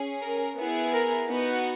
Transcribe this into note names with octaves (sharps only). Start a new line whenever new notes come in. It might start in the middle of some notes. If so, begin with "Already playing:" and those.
Already playing: C#4 G#4
A#4
B3 E4 G#4
A#4
B3 D#4 F#4